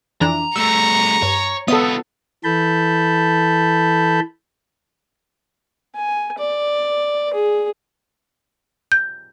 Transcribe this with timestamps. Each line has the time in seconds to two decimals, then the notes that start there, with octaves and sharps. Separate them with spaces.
0.21 F2 E3 D4 A#5
0.56 G3 A3 A#5 C#6 E6
1.22 G2 C#5
1.68 B3 F4 A4 B4 D#6
2.44 E3 A4 A5 B5 G6
5.95 G#5
6.38 D5
7.33 G#4
8.92 G6